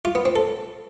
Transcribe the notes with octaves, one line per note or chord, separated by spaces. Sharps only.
F4
B3
C4
A4